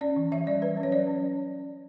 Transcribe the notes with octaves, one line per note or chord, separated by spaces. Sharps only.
C#4 D5
E3
E3 E5
G3 D5
F#3 B4
C#4
C#5
F#3 D5
C#4